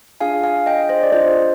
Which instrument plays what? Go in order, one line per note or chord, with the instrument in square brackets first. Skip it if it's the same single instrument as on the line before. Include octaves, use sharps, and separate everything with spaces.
[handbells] D4 F4 G#4 F5 G#5
F5 G#5
D#5 G5
C5 D#5
D5
D4 F4 G#4 C5 D#5